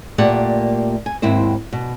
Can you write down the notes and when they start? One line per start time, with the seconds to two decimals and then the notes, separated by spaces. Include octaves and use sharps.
0.18 A#2 A3 A#3 G4 D5 F#5
1.06 G#5
1.22 D#2 G#2 C4 E4 C5
1.73 B2